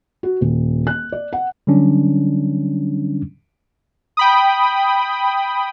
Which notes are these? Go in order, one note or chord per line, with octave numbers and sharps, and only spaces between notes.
F#4
D#1
F#6
D5
F#5
D3 F#3 G3 C#4 D4
G5 B5 D#6